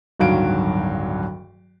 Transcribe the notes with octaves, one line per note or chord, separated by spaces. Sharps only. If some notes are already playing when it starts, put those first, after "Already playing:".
D1 G2 D#3 F#3 F5 D7